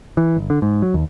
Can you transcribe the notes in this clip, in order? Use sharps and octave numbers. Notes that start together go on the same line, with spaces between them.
E3
G1
D3
G#2
F#3
D#2